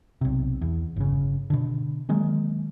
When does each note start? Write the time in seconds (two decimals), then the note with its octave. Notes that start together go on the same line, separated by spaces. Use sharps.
0.21 B1 C3
0.61 E2
0.96 G1 C#3
1.50 B2 D3
2.09 D#3 F#3 G#3 A#3